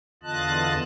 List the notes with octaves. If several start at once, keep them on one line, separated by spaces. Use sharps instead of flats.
E2 D3 F4 D#5 A5 F#6